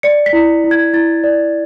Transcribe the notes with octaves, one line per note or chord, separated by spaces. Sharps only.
D5 C#7
B6
E4
E4
G#6
E4 A6
D5